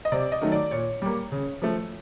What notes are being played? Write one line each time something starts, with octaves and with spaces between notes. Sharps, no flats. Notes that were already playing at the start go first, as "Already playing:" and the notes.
D#5
C3 D5
D#5
D#3 F#3 A3
D5
A#2 C#5
G3 A#3
C#3
F3 A3